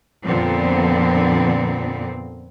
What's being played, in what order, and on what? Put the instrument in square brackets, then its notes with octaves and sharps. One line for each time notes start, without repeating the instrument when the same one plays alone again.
[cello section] F2 A#2 D3 F3 B3 C4